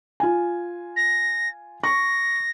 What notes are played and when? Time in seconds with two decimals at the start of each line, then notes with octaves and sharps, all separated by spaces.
0.20 F4 G#5
0.96 A#6
1.84 C#6 A#6